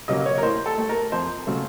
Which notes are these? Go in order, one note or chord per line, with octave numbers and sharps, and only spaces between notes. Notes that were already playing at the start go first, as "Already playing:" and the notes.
C#3 F#3 A#3 D#5
C#5
A#4
A2 C5
A4
A3
A#4
F2 C5
C#3 F#3 A3